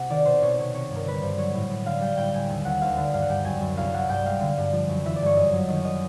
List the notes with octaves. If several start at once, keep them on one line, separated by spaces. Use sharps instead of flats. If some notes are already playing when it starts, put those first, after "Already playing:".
Already playing: C3 F#5
D#3 D5
B2 C5
B2 C#5
C3 C#5
C3 C#5
G2
A#4
D3 B4
G2 C5
F#3 C#5
A2
A2
D3 F5
G3 G5
A2 G5
A2 G#5
D#2
D#2 F#5
D2 F5
D3
G2 F5
F#5
G2 G5
F#2 G#5
F#2
C2 F5
C2 F#5
G2 G5
G#3 F5
D3
G2
F3
F#2
E3 E5
D5
G2 C#5
F#2 D#5
F#3
D#3 D#5
D#3 D#5